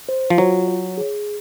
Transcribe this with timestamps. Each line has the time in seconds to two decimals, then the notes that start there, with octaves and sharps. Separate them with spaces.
0.09 C5
0.30 F3
0.38 F#3 F4
0.68 C#5
0.98 G#4